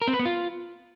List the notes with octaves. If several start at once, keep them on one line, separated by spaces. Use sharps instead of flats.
A#4
C4
B4
B3
F4